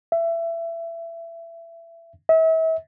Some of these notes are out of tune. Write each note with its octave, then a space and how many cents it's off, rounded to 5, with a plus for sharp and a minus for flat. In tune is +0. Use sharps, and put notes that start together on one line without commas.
E5 +25
E5 -35